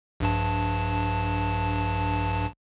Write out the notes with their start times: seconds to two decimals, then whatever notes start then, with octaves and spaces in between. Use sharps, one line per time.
0.20 A#1 G2 A5